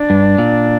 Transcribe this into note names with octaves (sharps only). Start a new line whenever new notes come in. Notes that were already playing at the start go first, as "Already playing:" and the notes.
Already playing: D4
G2
A#2